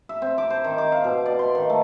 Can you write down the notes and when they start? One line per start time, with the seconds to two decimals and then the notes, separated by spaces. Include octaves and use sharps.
0.09 E5
0.22 C4
0.38 D6
0.50 C5
0.64 D#3
0.78 D6
0.92 F5
1.04 B2
1.26 D5
1.39 C6
1.55 D#3
1.70 A3